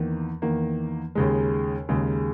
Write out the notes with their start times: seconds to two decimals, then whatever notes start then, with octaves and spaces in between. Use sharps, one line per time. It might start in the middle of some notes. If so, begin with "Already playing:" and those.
Already playing: E2 D#3 A#3
0.42 E2 D#3 A#3
1.15 D#2 C#3 G#3
1.89 D#2 C#3 G#3